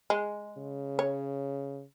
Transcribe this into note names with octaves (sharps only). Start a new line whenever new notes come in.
G#3
C#3
C#5